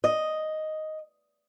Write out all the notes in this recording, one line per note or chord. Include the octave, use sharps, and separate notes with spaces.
D#5